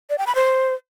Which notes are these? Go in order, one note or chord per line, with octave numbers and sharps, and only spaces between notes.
D5
G5
B5
C5